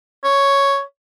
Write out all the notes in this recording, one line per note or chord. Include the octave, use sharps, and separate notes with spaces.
C#5